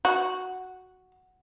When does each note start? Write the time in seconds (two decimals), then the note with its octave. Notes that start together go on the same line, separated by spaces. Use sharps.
0.05 F#4